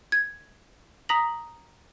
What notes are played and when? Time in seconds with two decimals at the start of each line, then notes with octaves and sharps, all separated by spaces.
0.12 G#6
1.09 A#5 D#6 A#6 B6 F#7